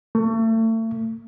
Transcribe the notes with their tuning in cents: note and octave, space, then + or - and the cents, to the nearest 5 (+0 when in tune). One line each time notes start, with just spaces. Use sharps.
A3 +35